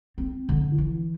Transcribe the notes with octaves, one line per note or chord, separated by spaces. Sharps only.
C4
D3
E3